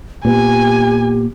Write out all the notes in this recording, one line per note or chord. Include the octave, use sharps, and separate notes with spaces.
A#2 B3 G4 G#5